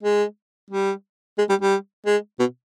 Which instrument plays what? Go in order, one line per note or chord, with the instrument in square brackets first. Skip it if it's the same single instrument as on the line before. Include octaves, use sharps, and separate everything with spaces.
[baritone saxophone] G#3
G3
G#3
G3
G3
G#3
B2